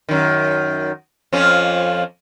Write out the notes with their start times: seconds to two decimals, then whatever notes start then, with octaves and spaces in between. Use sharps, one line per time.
0.09 F#2 D#3
1.33 F2 F3 C#4